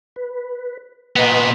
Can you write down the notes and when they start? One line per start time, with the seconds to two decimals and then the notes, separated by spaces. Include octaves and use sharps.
0.16 B4
1.16 A#2 B3 B4 D#5 F#5